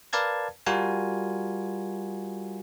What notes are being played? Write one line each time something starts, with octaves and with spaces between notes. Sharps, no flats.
A#4 B4 D5 F5 A5 G#6
G3 F4 F#4 A#4 G#5